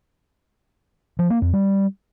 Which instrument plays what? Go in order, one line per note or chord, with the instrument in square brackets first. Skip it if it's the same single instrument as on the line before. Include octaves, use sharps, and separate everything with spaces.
[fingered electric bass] F3
A#3
F2
G3